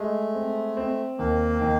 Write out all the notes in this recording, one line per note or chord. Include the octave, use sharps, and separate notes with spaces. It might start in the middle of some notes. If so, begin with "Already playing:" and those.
Already playing: G#3 A3
C4
C4
D#2 A#3
D#3